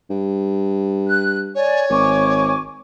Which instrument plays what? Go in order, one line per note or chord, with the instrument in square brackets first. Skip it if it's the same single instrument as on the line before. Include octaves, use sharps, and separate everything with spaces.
[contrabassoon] G2
[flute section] F#6
[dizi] C#5 [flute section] D5 G#5
[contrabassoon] G#1 [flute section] G#5 C#6 D6